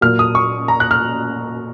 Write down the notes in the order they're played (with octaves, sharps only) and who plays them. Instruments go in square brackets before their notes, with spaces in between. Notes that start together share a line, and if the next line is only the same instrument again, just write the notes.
[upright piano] A#2 F#3 A#3 F6
D#6
C#6
A#5
F#6
F6